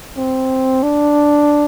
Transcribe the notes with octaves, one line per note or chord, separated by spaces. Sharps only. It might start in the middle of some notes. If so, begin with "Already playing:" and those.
C4
D4